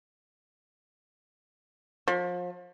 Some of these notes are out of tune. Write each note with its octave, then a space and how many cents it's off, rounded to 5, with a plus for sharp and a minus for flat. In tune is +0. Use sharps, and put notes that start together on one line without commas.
F3 +35